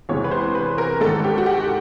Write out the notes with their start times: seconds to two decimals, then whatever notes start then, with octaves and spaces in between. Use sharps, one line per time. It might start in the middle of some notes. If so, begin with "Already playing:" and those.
0.09 E2 C3 E3 G#3 C#5
0.24 B4
0.31 C5
0.55 B4
0.78 A#4
1.01 G#2 D#3 G#3 C#4 A4
1.24 G4
1.38 F#4
1.46 G4